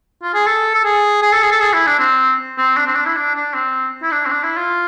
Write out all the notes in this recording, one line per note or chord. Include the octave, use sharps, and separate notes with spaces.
F4
G#4
A4
A4
G#4
G#4
A4
G#4
A4
G#4
E4
D4
C4
C4
D4
C4
D4
E4
D4
D4
C4
E4
D4
C4
D4
E4
F4